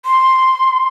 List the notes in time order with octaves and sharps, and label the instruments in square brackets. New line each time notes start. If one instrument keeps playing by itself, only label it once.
[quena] C6